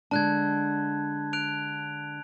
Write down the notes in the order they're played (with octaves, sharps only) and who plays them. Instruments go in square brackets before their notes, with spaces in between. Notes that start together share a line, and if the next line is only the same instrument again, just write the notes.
[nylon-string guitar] D3 G#3 D4 [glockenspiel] A5 F#6 G#6
[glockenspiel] F#6 D7 F7